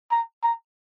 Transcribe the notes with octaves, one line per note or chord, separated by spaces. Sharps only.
A#5
A#5